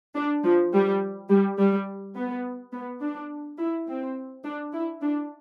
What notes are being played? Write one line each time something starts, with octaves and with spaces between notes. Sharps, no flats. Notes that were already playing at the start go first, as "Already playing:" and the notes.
D4
F3
G3
G3
G3
B3
B3
D4
E4
C4
D4
E4
D4